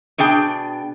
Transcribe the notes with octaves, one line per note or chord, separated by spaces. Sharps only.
B2 D4 G#4 G5